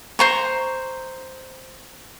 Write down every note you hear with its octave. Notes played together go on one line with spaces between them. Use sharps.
C5 A#5 C#6